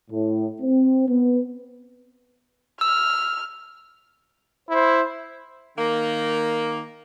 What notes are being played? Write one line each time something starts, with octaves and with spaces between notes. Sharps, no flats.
A2
C4
B3
E6 F6
E4 C5
D#3 A#3